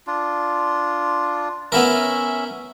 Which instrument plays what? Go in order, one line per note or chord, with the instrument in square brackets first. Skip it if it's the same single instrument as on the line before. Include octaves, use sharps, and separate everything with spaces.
[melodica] D4 F4
[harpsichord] B3 E4 A#4 [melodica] C#4 E5